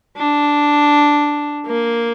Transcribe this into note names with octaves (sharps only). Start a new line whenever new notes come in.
D4
A#3